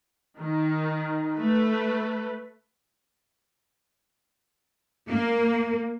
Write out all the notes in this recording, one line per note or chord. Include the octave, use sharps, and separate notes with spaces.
D#3
A3 A4 B4
A#3